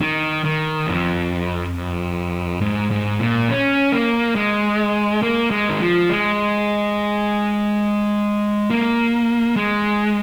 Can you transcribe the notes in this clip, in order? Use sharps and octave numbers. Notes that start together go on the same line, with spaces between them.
D#3
D#3
F2
G#2
G#2
A#2
C#4
A#3
G#3
A#3
G#3
D#3
F3
G#3
A#3
G#3